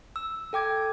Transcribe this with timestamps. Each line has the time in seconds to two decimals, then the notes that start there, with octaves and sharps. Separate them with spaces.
0.16 E6
0.53 A4 G5 D6 G#6